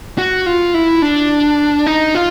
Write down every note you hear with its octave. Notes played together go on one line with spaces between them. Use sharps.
F#4
F4
E4
D4
D#4
F4